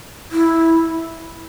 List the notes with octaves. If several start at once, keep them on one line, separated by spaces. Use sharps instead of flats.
E4